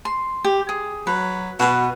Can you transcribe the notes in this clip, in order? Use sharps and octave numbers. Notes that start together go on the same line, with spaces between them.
C6
G4
G#4
F#3 B4
B2 F#4 B4